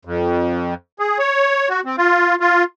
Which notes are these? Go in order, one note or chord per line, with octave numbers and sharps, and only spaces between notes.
F2
G#4
C#5
F#4
C4
F4
F4